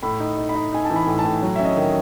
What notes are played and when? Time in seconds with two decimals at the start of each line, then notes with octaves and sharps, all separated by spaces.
0.03 A2 B5
0.20 D#4
0.37 D#4
0.49 B5
0.55 D#4
0.72 D#4 G#5
0.85 A5
0.90 E3
0.96 B5
1.07 A2
1.19 A5
1.25 A2
1.42 F#3
1.55 C#4 E5
1.65 D#5
1.77 D#3